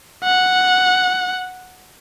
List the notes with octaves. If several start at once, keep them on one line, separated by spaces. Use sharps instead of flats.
F#5